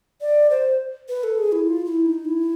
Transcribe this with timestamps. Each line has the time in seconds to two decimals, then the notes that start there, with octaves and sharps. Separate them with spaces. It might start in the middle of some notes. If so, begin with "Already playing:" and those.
0.21 D5
0.50 C5
1.09 B4
1.24 A4
1.38 G#4
1.52 E4
1.67 F4
1.86 E4
2.06 D#4
2.25 E4